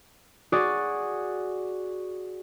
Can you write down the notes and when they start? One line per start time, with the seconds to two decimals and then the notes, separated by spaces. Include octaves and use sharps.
0.52 F#4 G#4 D5